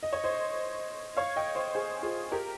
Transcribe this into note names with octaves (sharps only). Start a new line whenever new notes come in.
D#5
C#5
C5 D#5
C#5 F5
D#5 G5
C5 D#5
G#4 C5
F4 G#4
G4 A#4